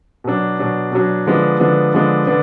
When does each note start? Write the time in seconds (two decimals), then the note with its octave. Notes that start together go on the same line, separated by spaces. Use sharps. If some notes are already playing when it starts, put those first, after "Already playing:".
0.24 B2 F#3 D4
0.59 B2 F#3 D4
0.92 B2 F#3 D4
1.26 D3 F3 G#3 B3 D4
1.59 D3 F3 G#3 B3 D4
1.94 D3 F3 G#3 B3 D4
2.27 D3 B3 D4